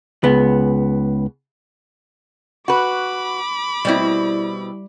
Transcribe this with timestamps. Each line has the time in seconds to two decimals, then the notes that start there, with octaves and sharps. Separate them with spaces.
0.24 C#2 B3
2.68 F#4 B4 B5 D6
3.85 B2 G3 C4 E4